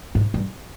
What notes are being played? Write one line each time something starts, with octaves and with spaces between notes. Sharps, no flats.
G#2
G2